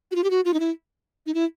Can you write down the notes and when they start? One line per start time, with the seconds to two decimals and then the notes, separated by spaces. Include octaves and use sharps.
0.12 F#4
0.15 F4
0.24 G4
0.30 F#4
0.45 F4
0.54 D#4
0.60 E4
1.26 D#4
1.34 E4